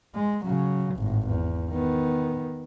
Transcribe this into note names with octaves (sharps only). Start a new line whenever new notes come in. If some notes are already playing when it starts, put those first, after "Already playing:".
G#3
C#3 F#3
G#1 A2
E2
D#3 B3